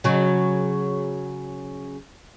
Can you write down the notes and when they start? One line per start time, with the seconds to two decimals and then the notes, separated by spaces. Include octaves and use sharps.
0.04 C#3 F#3